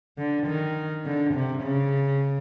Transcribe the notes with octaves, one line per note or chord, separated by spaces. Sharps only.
D3
D#3
D3
C3
C#3